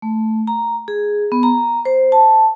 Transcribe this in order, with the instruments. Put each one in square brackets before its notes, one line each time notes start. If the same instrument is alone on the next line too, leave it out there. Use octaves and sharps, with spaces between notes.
[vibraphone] A3
A#5
G#4
B3
A#5
C5
A5